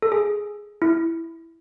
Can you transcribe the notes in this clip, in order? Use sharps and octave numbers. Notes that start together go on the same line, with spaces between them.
A4
G#4
E4